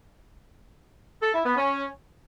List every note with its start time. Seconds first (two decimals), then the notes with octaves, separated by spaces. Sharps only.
1.22 A4
1.34 E4
1.45 B3
1.56 C#4